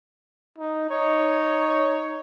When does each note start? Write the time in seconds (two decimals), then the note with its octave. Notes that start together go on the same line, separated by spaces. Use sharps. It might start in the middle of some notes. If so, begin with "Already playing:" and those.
0.58 D#4
0.90 D#4 C#5